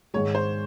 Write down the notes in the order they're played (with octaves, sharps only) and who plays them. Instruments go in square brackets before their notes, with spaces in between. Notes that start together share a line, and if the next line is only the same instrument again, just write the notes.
[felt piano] G#2 D#3 G#3 [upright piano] C#5
[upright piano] C5